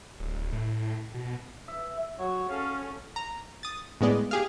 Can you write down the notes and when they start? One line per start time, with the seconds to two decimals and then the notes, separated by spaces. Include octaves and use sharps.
0.20 D1
0.53 A2
1.14 B2
1.68 E5
2.19 F#3 C#5
2.50 C#4 A4 F5
3.16 A#5
3.63 D#6 A6
4.01 A2 G#3 B3 D5 D#5
4.31 G4 G#4 F5